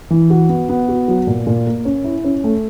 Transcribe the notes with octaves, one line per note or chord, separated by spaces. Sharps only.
E3
F#4
B3
B3
F#4
F#3
A#2
A#2
A#3
C#4
E4
C#4
A3